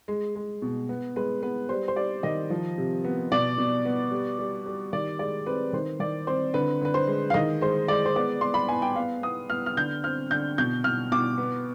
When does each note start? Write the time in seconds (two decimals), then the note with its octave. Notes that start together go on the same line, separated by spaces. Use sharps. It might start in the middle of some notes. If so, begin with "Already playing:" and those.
0.08 G#3
0.36 G#3
0.62 B2
0.89 B3
1.16 G#3 B4
1.43 B3 B4
1.69 G3 C5
1.88 C5
1.96 G3 D5
2.23 D#3 D#5
2.50 F3
2.78 C3
3.04 B3
3.32 B2 D5
3.58 B2
3.85 B3
4.11 G3
4.39 G3
4.66 G3
4.93 D#3 D5
5.19 G#3 D5
5.46 C4 B4
5.73 D#3 C5
6.00 D#3 D5
6.27 C4 C5
6.54 D3 B4
6.81 D3 B4
6.94 C5
7.07 G#3
7.30 F5
7.34 D#3 D#5
7.61 G#3 C5
7.88 G#3 D5
8.05 C5
8.16 B3 D5
8.41 B3 C6
8.54 B5
8.69 B3 G#5
8.82 G5
8.96 B3 F5
9.23 B3 D#6
9.49 B3 F6
9.66 F6
9.77 D3 G6
10.04 C4 F6
10.30 D3 G6
10.58 B2 G6
10.84 B2 F6
11.12 B2 D6
11.38 B3